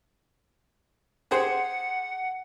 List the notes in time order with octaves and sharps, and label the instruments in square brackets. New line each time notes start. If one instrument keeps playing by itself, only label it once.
[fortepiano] G4 G#4 C5 [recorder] F#5